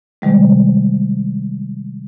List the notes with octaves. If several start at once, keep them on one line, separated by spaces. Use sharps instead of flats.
C3 D#3 G3 G#3